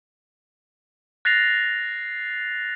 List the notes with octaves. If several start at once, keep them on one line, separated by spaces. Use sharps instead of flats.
F#6 A6 A#6 C7 F7